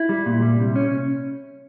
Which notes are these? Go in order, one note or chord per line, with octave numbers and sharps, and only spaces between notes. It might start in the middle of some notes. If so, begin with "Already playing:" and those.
Already playing: E4
G3
A#2
G3
C3
C#4